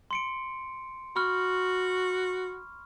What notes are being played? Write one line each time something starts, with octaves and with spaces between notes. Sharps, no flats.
C6 C#7 D7
F#4 B5 C#6 F6